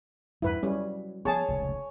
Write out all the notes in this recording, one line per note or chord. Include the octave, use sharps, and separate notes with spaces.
E2 G2 F#3 E4 B4
F#3 G3 C#4
F3 B3 G#4 C#5 G#5 A5
F1 C#2 A#2